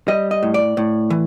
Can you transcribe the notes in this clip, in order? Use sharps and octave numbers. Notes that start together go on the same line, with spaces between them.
G3 D#5
D#5
A2
D5
A2
E3